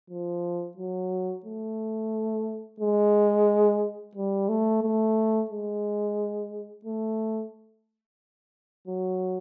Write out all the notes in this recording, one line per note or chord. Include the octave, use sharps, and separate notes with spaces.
F3
F#3
A3
G#3
G3
A3
A3
G#3
A3
F#3